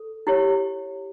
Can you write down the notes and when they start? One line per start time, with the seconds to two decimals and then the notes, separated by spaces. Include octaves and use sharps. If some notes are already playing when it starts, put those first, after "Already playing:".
Already playing: A4
0.27 E4 G4 C#5